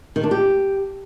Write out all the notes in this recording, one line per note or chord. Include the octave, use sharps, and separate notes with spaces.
D#3
D4
G4